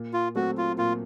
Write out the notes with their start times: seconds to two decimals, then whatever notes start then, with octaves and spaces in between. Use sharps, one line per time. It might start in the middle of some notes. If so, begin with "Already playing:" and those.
Already playing: A#2
0.13 F4
0.35 F#3 A3 C4 F#4
0.57 F4
0.78 A#2 F4